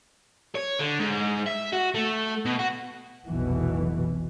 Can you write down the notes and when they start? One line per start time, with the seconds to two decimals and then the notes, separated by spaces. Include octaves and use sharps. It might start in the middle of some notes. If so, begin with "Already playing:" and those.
0.55 C#5
0.79 D3
1.00 G#2
1.46 E5
1.73 F#4
1.94 A3
2.45 B2
2.59 F#4
3.28 F1 B1 B2 E3